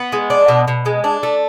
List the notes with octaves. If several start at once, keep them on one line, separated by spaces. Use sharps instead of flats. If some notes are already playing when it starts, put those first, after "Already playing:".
Already playing: B3
G#3
D4
B2
B2
G#3
D4
A3